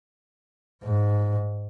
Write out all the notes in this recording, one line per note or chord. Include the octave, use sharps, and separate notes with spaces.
G#2